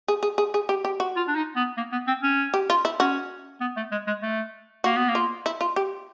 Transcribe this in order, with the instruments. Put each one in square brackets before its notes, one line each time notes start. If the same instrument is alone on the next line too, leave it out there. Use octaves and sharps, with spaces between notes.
[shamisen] G#4
G#4
G#4
G#4
G4
G4
F#4
[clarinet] F4
D4
D#4
B3
A#3
B3
C4
C#4
[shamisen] G4
F4
E4
[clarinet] C#4 [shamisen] F#4
[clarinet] B3
A3
G#3
G#3
A3
[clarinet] A#3 [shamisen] F#4
[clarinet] B3
A#3
[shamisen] F4
E4
F4
G4